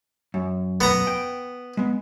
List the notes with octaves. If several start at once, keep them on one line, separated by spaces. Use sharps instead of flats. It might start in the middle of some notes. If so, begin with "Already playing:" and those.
F#2
B3 A#5
G5
G#3 B3